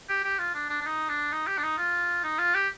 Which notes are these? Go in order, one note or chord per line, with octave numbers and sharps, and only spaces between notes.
G4
G4
F4
D4
D4
D4
D#4
D4
D#4
G4
D4
D#4
F4
D#4
F4
G4